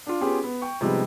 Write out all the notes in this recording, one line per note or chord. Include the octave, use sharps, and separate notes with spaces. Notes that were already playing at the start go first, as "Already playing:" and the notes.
D4 F4
B3 C#4 F4 G4 G#4
B3
G5 C#6
C3 F3 G3 G#3 B3 D#4